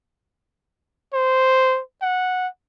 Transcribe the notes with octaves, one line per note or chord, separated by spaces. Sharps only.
C5
F#5